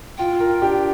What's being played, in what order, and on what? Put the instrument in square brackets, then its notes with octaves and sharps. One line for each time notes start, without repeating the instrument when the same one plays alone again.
[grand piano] F4 [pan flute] G5
[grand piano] F4 A#4
D4 G4